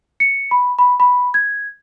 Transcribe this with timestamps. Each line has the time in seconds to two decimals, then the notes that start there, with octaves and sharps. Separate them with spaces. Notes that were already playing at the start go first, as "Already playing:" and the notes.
0.20 C#7
0.51 B5
0.79 B5
1.00 B5
1.34 G#6